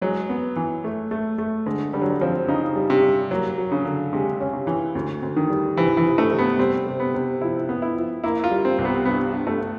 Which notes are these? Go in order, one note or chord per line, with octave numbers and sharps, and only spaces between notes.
F#3 G#3
B3
E3
A3
A3
A3
D3 G#3
D3 G3
F#3
G3
F3 C4
C#3 D#4
G3
C3
G3
F#3 A#3
F#3
C#3
D3
C3 G#3
C#4
C3
E3
D2
D2
D#3
G3
C3 E3
E3
C3
A3
C3
B3
G3 C4
C3
B3
C3
F3 E4
B3
E4
F3
A#3 E4
F4
G3
C4
C2
B3
G2 B3
G2
A3